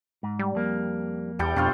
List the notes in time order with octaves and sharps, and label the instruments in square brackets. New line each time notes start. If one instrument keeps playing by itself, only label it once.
[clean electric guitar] G#2
[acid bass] G3
[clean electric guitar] F2 A#3
[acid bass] E2 [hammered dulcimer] G3 A4 G5
[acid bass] F2 [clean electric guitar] B2 [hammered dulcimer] D4 F4 C5